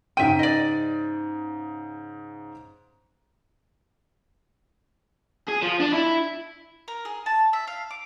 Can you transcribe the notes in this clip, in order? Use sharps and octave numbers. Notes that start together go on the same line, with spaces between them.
G#2 C#3 E5 G5 D#7
D5 D#5
G#4
F3
D4
E4
A#4
G#4
A5
E5
F5
D6